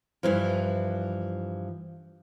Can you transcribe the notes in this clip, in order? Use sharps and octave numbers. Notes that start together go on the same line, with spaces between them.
G2 E3 F3